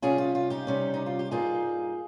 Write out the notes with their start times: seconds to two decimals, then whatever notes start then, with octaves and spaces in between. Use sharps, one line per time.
0.02 C3 G3 C#4 F4 G#4
0.18 F4
0.35 F4
0.50 D#4 G4
0.67 C3 G3 C#4
0.94 D#4
1.06 F4
1.19 G4
1.31 G2 G3 A#3 D#4 F4 G#4